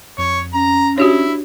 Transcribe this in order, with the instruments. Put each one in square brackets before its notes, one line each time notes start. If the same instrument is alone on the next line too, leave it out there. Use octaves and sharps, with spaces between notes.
[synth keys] F2 [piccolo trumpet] C#5
[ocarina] C#4 [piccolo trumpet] A#5
[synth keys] D4 [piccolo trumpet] E4 [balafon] F#4 G4 C#5